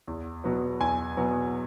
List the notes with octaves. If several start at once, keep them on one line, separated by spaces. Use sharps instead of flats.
E2
B2 F#3 B3
E2 G#5
B2 F#3 B3